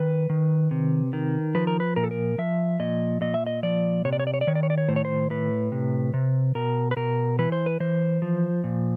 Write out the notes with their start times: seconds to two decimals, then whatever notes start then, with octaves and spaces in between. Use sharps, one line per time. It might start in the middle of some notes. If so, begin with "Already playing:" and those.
Already playing: D#3 B4
0.30 D#3
0.71 C3
1.13 D#3
1.55 F3 B4
1.67 A#4
1.80 B4
1.96 A#2 A#4
2.04 A4
2.11 A#4
2.38 F3 E5
2.80 A#2 D#5
3.21 A#2 D#5
3.34 E5
3.46 D#5
3.63 F3 D5
4.05 C3 C#5
4.13 D5
4.20 C#5
4.27 D5
4.34 C#5
4.41 D5
4.47 D#3 C#5
4.55 D5
4.63 C#5
4.70 D5
4.78 C#5
4.88 A2 C5
4.96 C#5
5.05 C5
5.30 A2 B4
5.72 C3
6.14 C3
6.55 B2 A#4
6.91 B4
6.96 B2 A#4
7.39 E3 B4
7.52 C5
7.66 B4
7.80 E3 C5
8.22 F3
8.64 A#2